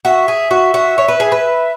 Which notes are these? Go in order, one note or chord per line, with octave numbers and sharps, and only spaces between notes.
F#4 E5
G#4
F#4
F#4
C#5
B4
G#4
B4